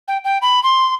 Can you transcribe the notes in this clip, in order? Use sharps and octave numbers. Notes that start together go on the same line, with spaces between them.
G5
G5
B5
C6